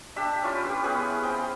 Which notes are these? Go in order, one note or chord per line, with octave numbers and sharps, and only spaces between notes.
D4 G4 E5 E6
C#4 E4 F4
G4 B4
B3 C#4 G#4 B4
C4 G5